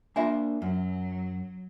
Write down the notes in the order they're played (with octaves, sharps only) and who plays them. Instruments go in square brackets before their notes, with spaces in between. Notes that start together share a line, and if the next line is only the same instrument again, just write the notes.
[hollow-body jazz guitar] A#3 D4 C5 [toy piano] F4 E5 G#5
[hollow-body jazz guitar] F#2 [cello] F#3